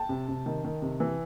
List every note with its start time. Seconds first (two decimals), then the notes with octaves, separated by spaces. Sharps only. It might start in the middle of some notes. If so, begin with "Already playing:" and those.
Already playing: G5 A5
0.09 C3
0.28 C3
0.46 D#3
0.64 D#3
0.82 C3
1.00 E3